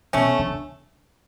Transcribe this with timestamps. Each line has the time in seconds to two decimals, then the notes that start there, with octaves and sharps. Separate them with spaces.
0.13 B2 A3 C#4
0.39 D3